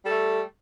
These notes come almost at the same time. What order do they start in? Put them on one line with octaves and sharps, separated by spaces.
G3 A4 A3